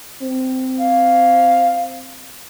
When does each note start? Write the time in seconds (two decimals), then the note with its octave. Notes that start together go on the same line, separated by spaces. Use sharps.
0.22 C4
0.80 F5